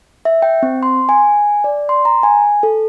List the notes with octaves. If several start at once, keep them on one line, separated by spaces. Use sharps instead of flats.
E5
G5
C4
C6
G#5
D5
C6
A#5
G#5
A4